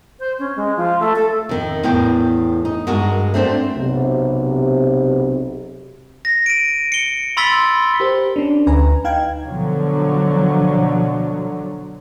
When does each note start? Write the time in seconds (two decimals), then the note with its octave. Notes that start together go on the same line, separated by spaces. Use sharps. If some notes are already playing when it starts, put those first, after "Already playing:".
0.20 C5
0.39 C#4
0.56 G#3
0.76 F3
1.00 A3
1.16 A4
1.49 F2 D#3
1.83 E2 A2 G5
2.65 D#4
2.87 G2 G#3 F#4 A#4
3.34 A3 C4 D4 C5
3.75 B1 C3
6.25 A#6
6.46 D7 D#7
6.92 C#7 G7
7.37 B5 C6 E6 A6 B6 G7
8.00 G4 A#4 C5
8.36 C#4 D4
8.67 D2 B4 G#5 A#5
9.04 D#4 F5 G5 G#6
9.46 B2 D3 F3 F#3